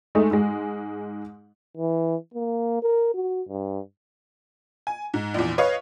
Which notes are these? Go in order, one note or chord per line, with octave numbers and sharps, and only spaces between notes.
G#3 A3 D#4
G#2 G#3
E3
A#3
A#4
F#4
G2
G#5
G#2
A#1 E2
B4 C#5 D#5 F5 C#6